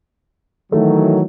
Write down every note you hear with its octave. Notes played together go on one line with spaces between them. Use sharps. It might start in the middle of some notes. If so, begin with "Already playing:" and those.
D#3 E3 F#3 A3